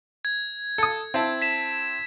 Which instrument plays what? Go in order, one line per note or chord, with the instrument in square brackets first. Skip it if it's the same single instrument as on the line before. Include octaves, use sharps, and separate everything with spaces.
[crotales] G#6
[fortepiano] A4 D#6
C4 E4 A5
[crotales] B6 E7